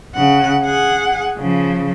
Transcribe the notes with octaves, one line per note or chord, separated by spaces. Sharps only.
C#3 F#5
G#4 F#5
C#3 F3